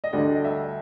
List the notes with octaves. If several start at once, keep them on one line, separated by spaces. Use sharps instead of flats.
D#5
D2 D3 G3 D5
D#5
E5